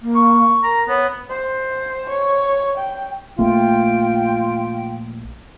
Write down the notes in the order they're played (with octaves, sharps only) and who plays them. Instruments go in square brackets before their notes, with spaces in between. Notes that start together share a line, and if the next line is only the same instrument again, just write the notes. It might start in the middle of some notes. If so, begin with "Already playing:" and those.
[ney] A#3
[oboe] C#6
[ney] A#4 [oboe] A#5
[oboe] B3 [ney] C#5
[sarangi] C5
C#5
G5
[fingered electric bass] A#1 A3 A#3 [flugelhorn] F4 [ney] G5